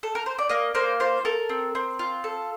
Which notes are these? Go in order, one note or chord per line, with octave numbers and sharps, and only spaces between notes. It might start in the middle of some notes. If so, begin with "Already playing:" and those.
A4
A#4
C5
D5
A#3 D#5
A#3 C5
F4 C5
A4 A#4
C4
C4
F4
A4